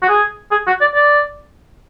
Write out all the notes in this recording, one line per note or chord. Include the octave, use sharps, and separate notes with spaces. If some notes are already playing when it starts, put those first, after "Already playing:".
F#4
G#4
G#4
F#4
D5
D5